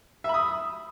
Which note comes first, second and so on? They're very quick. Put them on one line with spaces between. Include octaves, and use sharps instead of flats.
E5 B5 D#6